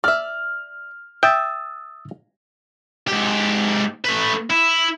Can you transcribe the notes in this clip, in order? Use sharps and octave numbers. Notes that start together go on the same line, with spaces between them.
D5 E5 F6
E5 G5 D#6 E6 A6
G#2 G4
A3 B4
E4